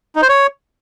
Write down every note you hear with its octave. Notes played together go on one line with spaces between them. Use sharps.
D#4
C5
C#5